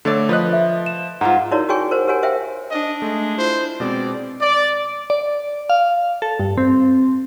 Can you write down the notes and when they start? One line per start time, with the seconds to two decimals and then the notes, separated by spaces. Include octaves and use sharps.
0.05 D3 A3 A4 C#5 D5
0.29 F3 B4 D#5 F#6
0.53 E5
0.86 E7
1.21 G#2 F4 C5 F#5 A#5
1.51 D#4 E4 F#4 A#4 C#5 D5
1.69 F#4 G#4 C#5 G5 G#5 C#6
1.91 A#4 C5 F#5
2.07 G4 A#4 C#5 F#5 G#5
2.23 C5 E5 F5 G5
2.71 D4 D#5
3.02 G#3 A3
3.38 E4 F4 C5
3.80 B2 G#3 C4 D5
4.42 D5
5.10 D5
5.70 F5
6.22 A4
6.40 G2
6.57 C4